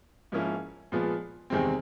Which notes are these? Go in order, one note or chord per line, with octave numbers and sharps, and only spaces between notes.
G#2 F3 A#3 C#4 E4
A#2 F3 G#3 B3
E2 C3 D#3 G#3 C4